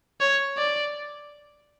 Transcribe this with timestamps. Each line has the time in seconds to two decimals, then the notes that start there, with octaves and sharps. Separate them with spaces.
0.21 C#5
0.57 D5